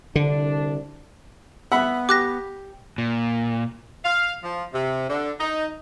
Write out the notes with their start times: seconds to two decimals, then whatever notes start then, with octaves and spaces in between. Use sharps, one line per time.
0.16 C2 D3 D4
1.72 B3 E5 F#5 B5
2.09 G4 D6 F#6 A#6
2.98 A#2
4.05 F5
4.43 F3
4.74 C3
5.09 D3
5.40 D#4